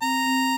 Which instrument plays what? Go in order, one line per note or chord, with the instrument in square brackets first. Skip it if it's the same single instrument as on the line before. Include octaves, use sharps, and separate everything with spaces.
[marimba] C4 [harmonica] A#5
[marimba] C4